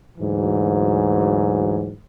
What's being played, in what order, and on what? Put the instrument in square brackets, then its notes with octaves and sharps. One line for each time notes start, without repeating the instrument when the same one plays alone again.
[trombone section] D2 G#2 E3 F#3